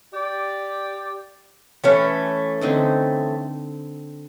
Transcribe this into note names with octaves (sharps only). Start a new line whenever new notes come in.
G4 D5
E3 A3 C#4
D3 C4 D#4